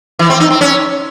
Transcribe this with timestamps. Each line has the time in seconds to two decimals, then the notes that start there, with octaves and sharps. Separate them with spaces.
0.19 E3
0.30 C4
0.40 D#4
0.51 C4
0.61 C#4